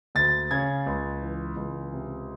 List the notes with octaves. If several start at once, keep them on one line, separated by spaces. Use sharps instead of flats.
D2 A6
C#3 G#6
C#2
E3
C#2
C3